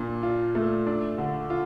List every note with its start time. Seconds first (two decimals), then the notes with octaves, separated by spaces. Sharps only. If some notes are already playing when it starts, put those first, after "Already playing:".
Already playing: A#2 D4
0.23 F4
0.55 A3
0.86 D4
1.18 D3
1.50 F4